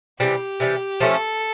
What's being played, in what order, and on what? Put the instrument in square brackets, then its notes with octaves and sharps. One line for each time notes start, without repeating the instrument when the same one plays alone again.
[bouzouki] C3 E3 G3 [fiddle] G4
[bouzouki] C3 E3 G3
[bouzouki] F3 A3 C#4 E4 [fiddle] A4